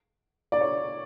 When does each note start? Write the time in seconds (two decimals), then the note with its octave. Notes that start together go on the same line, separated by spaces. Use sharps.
0.52 D5
0.61 C#5